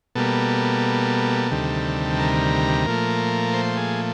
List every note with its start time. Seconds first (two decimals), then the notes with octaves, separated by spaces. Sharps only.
0.15 B2 G3 A#3 A4
1.51 D2 C3 D#3 G3
2.19 A#4
2.87 A#2 F3 A3
3.54 C5
3.77 G#4